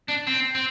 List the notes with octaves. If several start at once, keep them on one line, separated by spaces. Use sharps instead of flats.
D4
C4
C4